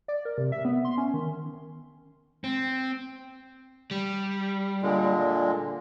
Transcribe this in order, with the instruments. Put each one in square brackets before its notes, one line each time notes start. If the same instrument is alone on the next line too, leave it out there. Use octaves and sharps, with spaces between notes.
[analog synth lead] D5
A#4
C3
E5
B3
C6
C#4
D#3
[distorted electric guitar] C4
[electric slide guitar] G3
[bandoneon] A#2 D3 G#3